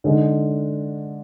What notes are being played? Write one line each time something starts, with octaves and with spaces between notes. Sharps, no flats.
D3 G#3 D#4